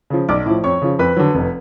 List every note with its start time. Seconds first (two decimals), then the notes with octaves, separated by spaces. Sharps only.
0.10 C#3 F3
0.29 B1 D5 D6
0.46 A2 F3
0.64 F2 C#5 C#6
0.82 C#3 F3
0.99 F2 B4 B5
1.17 D3 F#3
1.35 F1